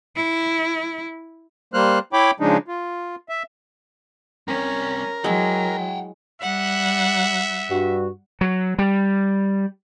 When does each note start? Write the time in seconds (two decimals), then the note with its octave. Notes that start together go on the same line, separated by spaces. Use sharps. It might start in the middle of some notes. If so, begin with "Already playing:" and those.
0.16 E4
1.74 G3 A#3 C5 F6 F#6
2.13 E4 C#5 G5 B5 D6
2.40 C#3 F3 G#3 D4 D#4
2.68 F4
3.29 E5
4.48 G3 C4 C#4 A#4
5.24 F#3 G#3 E4 F#5 G5
6.41 G3 E5 F#5 F#6
7.70 G2 F#4
8.41 F#3
8.79 G3